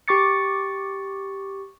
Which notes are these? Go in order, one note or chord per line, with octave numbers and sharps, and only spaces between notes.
G4 C#6 D6 A6 C#7